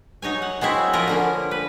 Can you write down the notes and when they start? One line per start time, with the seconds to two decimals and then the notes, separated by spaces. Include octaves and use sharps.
0.22 F#3 D#4 C#5 G#5
0.42 F#5
0.61 F#3 G#3 C4 E4
0.93 F3 A#3 B3 A#4
1.07 D3 A#3 C#4
1.51 B4